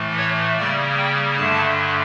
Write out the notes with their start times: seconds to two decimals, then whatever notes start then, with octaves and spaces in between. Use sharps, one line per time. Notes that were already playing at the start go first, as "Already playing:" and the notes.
Already playing: A2 E3 A3
0.18 C#5
0.57 C#3 G3 A#3 D5
0.97 G5
1.37 G2 D3 A3 A5